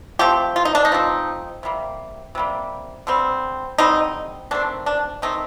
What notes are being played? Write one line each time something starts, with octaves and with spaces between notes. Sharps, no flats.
F3 A3 C4 G4
F4
D#4
D4
D#4
F3 A3 C4
C3 G3 A#3
C3 G3 A#3
D3 G3 C4
D3 G3 C4 D#4
D#3 A3 C4 D4
D4
D#3 A3 C4 D#4